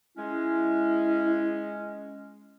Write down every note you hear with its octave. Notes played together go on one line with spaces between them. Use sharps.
G#3 C#4 E4